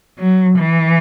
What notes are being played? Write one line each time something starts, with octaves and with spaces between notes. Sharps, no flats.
F#3
E3